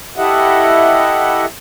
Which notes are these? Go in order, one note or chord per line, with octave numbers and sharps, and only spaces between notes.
E4 G4 A4 D#5 E5 F#5